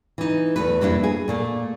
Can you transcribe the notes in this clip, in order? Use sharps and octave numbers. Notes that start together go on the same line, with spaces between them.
E3 D#4
E2 A3 B4
F2 G3 A#3 D4 E4
G#4
A#2 A3 A#3